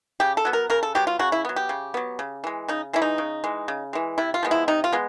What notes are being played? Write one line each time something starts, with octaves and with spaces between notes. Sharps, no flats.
C#3 G4
A4
F#3 B3
A#4
C#3 A#4
A4
F#3 B3 G4
F4
C#3 F#4
E4
F#3 B3
G4
C#3
F#3 B3
C#3
E3 G#3
C#3 D#4
E3 G#3 E4
D#4
C#3
E3 G#3
C#3
E3 G#3
C3 E4
F4
F3 G#3 B3
E4
C3 D#4
F4
G#3 B3